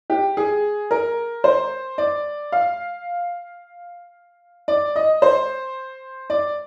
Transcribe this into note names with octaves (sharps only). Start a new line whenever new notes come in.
G4
G#4
A#4
C5
D5
F5
D5
D#5
C5
D5